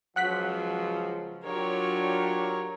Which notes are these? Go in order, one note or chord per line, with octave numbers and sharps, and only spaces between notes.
C#2 C#3 F3 F#3 F#5 F#6 B6
F#3 D4 F4 G4 A#4 C#5